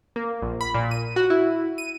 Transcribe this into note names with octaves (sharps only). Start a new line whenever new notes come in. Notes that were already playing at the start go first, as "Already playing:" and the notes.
A#3
A#1
B5
A#2
D#7
F#4
E4
D#7